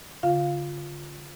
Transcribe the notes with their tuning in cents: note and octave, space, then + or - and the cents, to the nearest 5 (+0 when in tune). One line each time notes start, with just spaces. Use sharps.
D3 -40 F4 +0 F5 +0